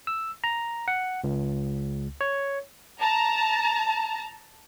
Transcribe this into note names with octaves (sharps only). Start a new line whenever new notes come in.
E6
A#5
F#5
C#2
C#5
A5 A#5